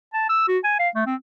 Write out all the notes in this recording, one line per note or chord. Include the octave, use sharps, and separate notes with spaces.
A5
E6
F#4
G#5
F5
A3
C4